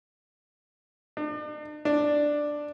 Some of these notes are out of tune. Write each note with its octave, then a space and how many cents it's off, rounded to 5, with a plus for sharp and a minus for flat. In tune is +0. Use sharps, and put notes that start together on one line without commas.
D4 +40
D4 +5